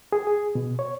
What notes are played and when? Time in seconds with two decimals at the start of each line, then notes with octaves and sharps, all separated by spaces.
0.12 G#4
0.27 G#4
0.55 B2
0.79 C#5